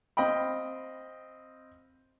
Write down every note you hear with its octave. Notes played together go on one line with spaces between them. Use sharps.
C4 D#5 F5 G5 B5